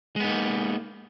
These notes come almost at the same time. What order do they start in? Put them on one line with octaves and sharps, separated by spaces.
G#3 B3 D#4 A#3